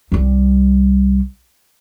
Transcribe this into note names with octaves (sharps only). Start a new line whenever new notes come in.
C2 G3